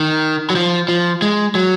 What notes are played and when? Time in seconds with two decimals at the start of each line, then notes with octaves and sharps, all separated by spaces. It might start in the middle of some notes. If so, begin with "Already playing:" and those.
Already playing: D#3
0.50 F#3
0.55 F3
0.89 F3
1.22 G#3
1.55 F#3